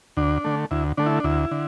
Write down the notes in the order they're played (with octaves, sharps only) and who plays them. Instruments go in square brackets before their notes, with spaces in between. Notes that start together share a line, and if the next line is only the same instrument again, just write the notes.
[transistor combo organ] D2 D4
D3 A3
D2 E4
D3 A3 D4
E4
D4
D2 E4
D3